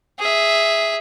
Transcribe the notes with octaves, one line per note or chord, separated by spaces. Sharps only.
G#4 E5